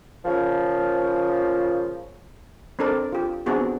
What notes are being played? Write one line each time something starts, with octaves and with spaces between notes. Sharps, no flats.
A#2 C#3 F3
C4 D4 A4 A#4 D5
F4 G4
B3 C4 D4 F#4 G#4